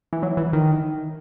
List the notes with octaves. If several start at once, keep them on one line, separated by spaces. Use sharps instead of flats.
E3
F#3
E3
D#3